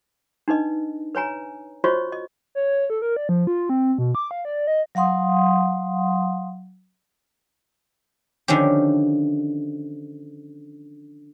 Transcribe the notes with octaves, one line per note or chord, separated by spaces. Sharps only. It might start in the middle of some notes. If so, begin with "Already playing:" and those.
D4 D#4 B4 D#5
B4 C#5 G#5 A#5
F4 F#4 C5 C#5 D#5 C#6
D#5
C#5
A4
A#4
D5
F3
F4
C4
B2
D6
F5
D5
D#5
F#3 F5 F#5 C6 D#6
D3 D#3 F3 C#4 G4